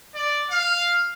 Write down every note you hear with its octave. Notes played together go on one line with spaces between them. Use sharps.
D5
F5